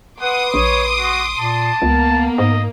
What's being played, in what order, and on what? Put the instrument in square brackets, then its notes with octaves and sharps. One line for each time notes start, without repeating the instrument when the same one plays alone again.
[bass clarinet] B4 [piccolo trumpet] F#5 [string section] C6 D6 D#6
[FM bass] A#1 [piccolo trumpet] C#5
[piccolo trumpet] F#4
[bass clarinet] A#2 [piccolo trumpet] A5
[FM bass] C#2 [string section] A#3 [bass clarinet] B3
[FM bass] G#2 [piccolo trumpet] D#5